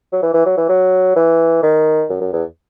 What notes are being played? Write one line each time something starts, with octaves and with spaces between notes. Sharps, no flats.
F#3
E3
E3
F#3
E3
F#3
E3
D#3
F#2
F#2
E2